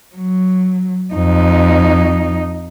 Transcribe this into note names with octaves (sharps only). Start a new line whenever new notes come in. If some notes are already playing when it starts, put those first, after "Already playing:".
F#3
F2 D#4